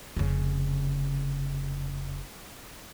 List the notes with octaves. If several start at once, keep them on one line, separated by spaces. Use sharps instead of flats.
F1 C#3